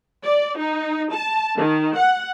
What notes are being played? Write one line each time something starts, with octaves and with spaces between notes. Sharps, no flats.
D5
D#4
A5
D#3
F#5